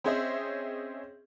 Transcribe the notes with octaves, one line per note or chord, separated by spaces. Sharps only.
C4 C#4 G#4 C5 D#5 E5